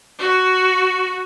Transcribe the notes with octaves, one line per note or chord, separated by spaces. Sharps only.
F#4